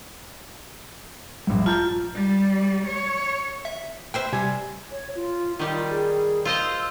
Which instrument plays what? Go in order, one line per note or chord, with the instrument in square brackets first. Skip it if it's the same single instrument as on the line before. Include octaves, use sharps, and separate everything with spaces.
[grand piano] A#1 G2
[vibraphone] F4 [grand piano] A5 A#5 G6
[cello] G3
C#5
[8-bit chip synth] E5
[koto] B4 C5 E5 [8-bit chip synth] G5
[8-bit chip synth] C3 [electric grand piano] G3 G#5 G#6
[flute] C#5
F4
[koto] D#3 G3 [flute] F4
[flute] G#4
[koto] F4 C5 D#5 [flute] E6